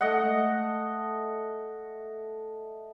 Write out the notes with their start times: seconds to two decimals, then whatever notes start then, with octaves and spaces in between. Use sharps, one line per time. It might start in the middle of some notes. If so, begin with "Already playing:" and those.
0.01 A3 D#5 F#5